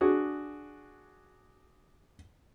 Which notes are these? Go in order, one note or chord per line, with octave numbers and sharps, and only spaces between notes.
D4 F#4 G#4